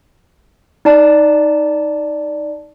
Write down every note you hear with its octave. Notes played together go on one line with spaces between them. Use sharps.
D#4 D5 A5